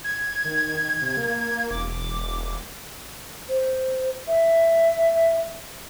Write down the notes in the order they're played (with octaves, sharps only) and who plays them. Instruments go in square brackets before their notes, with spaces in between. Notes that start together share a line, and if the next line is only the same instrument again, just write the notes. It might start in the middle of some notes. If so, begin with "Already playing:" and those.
[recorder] G#6
[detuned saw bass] D#3
C3
A#3
[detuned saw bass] E1 [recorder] D6
[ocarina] C5
E5